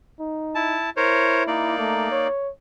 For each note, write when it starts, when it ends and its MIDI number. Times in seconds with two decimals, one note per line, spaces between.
0.20 0.79 63
0.55 0.90 64
0.55 0.90 81
0.97 1.74 64
0.97 1.43 70
0.97 1.43 72
0.97 1.43 73
1.47 2.28 58
1.47 2.28 63
1.47 2.28 74
1.78 2.07 57
2.11 2.51 73